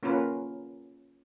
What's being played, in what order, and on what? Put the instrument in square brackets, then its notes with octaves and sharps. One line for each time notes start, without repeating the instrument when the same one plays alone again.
[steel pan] A#3 C#4 F4 A#4 B4